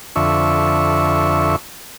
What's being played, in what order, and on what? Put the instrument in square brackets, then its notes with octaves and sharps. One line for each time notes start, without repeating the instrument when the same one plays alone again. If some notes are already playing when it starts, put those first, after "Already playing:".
[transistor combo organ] F2 D3 E5 C#6